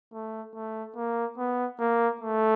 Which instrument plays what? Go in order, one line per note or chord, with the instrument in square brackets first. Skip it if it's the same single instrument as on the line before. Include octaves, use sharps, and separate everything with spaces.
[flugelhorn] A3
A3
A#3
B3
A#3
A3